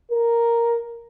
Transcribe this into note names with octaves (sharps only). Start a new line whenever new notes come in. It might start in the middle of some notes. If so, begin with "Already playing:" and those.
A#4